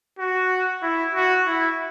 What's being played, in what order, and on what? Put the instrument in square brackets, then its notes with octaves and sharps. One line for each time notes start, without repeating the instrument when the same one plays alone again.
[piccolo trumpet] F#4
E4
F#4
E4